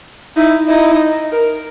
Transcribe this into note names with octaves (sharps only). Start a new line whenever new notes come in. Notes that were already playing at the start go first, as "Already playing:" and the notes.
D#4 E4
D#4 E4
A#4